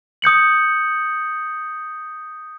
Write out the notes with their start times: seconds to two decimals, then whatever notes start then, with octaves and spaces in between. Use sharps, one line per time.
0.22 D#6 G6 C#7 F#7